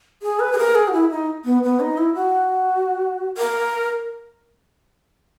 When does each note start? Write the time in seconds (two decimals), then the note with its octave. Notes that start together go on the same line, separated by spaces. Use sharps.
0.22 G#4
0.40 B4
0.52 G#4
0.58 A#4
0.75 G#4
0.88 F#4
0.93 E4
1.10 D#4
1.45 B3
1.63 B3
1.80 D#4
1.98 E4
2.15 F#4
3.38 A#4